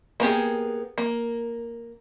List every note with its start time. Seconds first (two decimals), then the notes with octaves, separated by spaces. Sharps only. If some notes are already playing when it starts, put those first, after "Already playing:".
0.20 A#3 B3 G4 G#4
0.98 A#3